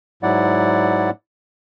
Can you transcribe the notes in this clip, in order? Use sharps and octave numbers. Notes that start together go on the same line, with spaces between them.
G#2 F#3 E4 D5 F#5